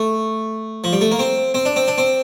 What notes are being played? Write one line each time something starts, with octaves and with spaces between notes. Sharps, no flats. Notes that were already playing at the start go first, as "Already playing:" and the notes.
Already playing: A3
F3
G3
A3
A#3
C4
C4
D4
C4
D4
C4